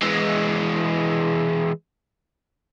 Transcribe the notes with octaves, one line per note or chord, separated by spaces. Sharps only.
E3 G#3